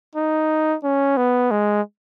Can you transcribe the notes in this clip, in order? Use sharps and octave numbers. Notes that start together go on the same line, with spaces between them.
D#4
C#4
B3
G#3